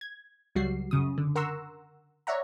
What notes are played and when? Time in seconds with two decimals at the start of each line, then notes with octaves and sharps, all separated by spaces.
0.01 G#6
0.55 C#2 F#3 G3 F#4 C7
0.91 F#2 C#3 D#6
1.18 D3
1.35 A#4 F#5 A#5 C6 C#6 E6
2.27 C#5 D5 E5 F#5 A#5